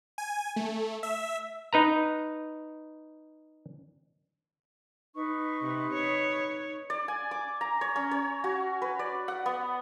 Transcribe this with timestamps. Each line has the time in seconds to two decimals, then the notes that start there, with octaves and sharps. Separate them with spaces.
0.18 G#5
0.56 A3
1.03 E5
1.73 D#4 B4 A#5
5.14 D#4 B4 C#6
5.62 C3
5.93 C#5
6.90 D5
7.08 G#5
7.31 D6
7.61 A#5
7.81 C#5
7.96 C#4
8.11 C#5
8.44 F#4
8.82 B4
8.99 D5
9.28 F#5
9.46 B3